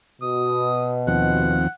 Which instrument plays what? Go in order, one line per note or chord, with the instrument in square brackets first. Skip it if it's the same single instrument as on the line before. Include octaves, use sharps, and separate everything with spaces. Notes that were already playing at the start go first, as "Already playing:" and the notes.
[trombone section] B2 [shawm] D#6
[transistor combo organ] D#2 F3 C4 [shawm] F#5